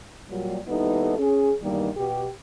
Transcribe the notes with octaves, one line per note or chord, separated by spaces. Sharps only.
A#2 F#3 G3
D#2 G3 B3 D#4 E4 A4
C#4 G#4
E2 G2 D#3 G3 A#3 D#4
B2 G4